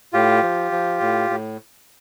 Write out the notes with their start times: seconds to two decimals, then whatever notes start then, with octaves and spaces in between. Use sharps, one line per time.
0.13 A2 F4 G4
0.43 F3
0.72 F3
1.01 A2
1.30 A2